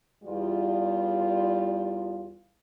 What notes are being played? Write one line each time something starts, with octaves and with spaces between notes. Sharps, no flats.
E2 G3 F4